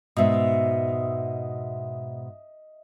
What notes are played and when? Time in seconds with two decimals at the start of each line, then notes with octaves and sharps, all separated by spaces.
0.17 G#2 B2 D#5 E5